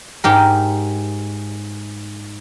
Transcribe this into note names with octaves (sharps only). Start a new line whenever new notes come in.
G#2 G4 A#4